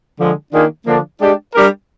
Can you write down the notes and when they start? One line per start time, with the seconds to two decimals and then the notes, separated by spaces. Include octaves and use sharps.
0.19 D3 F3 G#3
0.53 D#3 A#3 D4 F4 G#4
0.86 D3 F3 A#3 D4
1.20 G#3 D4 G4
1.54 G3 D4 G4 A#4